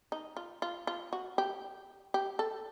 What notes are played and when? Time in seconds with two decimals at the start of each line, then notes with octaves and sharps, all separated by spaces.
0.12 D#4
0.37 F4
0.62 F4
0.87 F4
1.13 F#4
1.38 G4
2.14 G4
2.39 A4